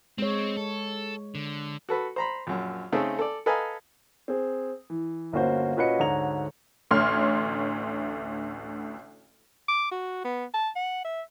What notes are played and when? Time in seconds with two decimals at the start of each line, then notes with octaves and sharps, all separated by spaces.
0.18 G#3 C4 C#5
0.57 A4
1.35 D3
1.89 F#4 A4 B4
2.16 C5 A#5 B5
2.47 A#1 F#2
2.92 C#3 A3 C4 D#4 A4
3.19 A4 D5
3.46 A4 B4 D#5 F5 G#5 A#5
4.28 C4 G#4
4.90 E3
5.33 G1 A#3 C#4 F#4 C5
5.77 A#2 C#4 F#4 B4 D#5 C#7
5.99 D2 G#2 D3 C#5 A#5 F7
6.91 A1 D2 C#5 C6 F6
9.69 D6
9.91 F#4
10.24 B3
10.54 A5
10.76 F#5
11.05 E5